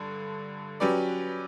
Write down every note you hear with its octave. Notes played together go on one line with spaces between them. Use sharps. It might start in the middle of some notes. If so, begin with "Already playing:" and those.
Already playing: G2 D3
F#3 C#4 G4 B4 D5